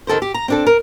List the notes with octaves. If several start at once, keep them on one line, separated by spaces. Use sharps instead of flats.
C3 D#3 A4 A#4 C5
G4
A#5
C4 D4 A4
A#4